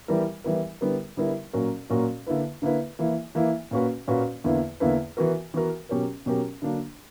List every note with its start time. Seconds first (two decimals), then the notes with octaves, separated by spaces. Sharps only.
0.08 E3 G3 B3 E4 A#4
0.44 E3 G3 B3 E4 A#4
0.81 D3 G3 B3 E4 A#4
1.17 D3 G3 B3 E4 A#4
1.53 A#2 F#3 C#4 F#4 A#4
1.90 A#2 F#3 C#4 F#4 A#4
2.27 D3 A#3 E4 B4
2.62 D3 A#3 E4 B4
2.99 E3 A#3 E4
3.35 E3 A#3 E4
3.71 A#2 A#3 C#4 F#4 B4
4.08 A#2 A#3 C#4 F#4 B4
4.44 E2 D3 A#3 E4 B4
4.80 E2 D3 A#3 E4 B4
5.17 E3 B3 F#4 A#4
5.54 E3 B3 F#4 A#4
5.89 B2 F#3 C#4 G4 A#4
6.26 B2 F#3 C#4 G4 A#4
6.62 D3 F#3 A#3 D4